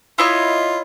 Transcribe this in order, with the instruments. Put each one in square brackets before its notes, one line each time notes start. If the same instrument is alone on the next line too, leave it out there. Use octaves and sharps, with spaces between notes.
[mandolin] E4 C#5 D#5 [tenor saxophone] F4